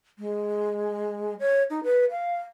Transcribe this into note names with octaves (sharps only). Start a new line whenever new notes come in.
G#3
C#5
D#4
B4
F5